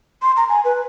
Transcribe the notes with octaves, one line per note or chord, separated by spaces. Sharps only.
C6
A#5
G#5
B4